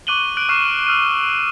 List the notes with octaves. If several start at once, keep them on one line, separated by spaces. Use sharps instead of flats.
C#6 D6 F#6 D#7 F#7 G7
F#6 D7 F#7
C#6 D6 F6 F#6 C7 E7
E6 F6 D#7